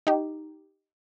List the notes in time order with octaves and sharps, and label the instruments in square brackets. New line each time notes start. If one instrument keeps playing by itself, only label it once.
[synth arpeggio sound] D#4 G4